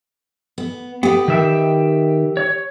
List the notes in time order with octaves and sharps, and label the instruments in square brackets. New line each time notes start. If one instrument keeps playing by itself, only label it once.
[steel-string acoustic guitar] B3
[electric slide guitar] B3 [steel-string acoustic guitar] G4 B4
[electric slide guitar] D#3 E5 G5
C#5